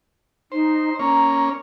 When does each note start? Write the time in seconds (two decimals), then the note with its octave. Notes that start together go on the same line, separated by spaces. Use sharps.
0.52 D#4 C5
0.99 A#3 C#4 C#5 A#5